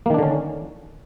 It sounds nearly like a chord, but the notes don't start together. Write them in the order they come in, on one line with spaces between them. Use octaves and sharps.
A#3 D#3 D4 D3 C#4